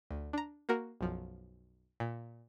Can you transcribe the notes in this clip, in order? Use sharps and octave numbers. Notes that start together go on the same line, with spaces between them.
D2
D4 A#5
A#3 F#4 A#4
B1 F#2 F3
A#2